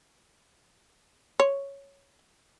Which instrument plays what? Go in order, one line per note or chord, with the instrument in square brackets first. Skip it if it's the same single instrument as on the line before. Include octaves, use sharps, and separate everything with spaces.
[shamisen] C#5